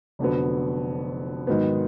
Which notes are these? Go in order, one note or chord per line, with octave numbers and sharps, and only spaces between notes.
F1 F2 D3 F#3 B3
G#2 D#3 F#3 B3